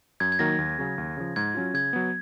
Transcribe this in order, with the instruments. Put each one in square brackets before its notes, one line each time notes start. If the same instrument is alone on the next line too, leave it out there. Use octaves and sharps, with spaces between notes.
[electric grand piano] F#2 [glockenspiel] G#6
[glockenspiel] G#6
[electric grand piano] D#3 F#3 A#3 D#4 [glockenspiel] A#6
[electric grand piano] D#2
C#3 F#3 C#4 G#4
D#2
C#3 F3
[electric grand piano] G#2 [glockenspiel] G#6
[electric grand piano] F#3 C#4 F4
[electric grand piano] C#3 [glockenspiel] G#6
[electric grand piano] F#3 B3